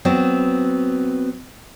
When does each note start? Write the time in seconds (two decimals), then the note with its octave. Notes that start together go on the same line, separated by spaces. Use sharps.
0.05 F#3 B3 C4